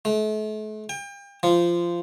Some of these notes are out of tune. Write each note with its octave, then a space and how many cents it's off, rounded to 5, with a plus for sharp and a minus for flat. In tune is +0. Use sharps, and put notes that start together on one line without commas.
A3 -40
G5 +35
F3 -15